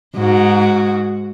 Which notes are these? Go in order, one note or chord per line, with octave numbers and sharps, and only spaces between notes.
G#2 F#4